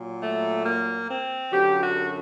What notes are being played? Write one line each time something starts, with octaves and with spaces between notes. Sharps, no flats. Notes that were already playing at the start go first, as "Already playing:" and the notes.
Already playing: A#2 F#3
A3
A#3
C4
F#2 D3 F#3 G4
F#4